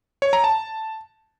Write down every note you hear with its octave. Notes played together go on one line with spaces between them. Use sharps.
C#5
A#5
A5